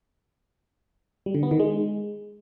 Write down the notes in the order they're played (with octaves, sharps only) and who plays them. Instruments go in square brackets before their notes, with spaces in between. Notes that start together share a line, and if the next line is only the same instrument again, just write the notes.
[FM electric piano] G3
D3
B3
D#3
G#3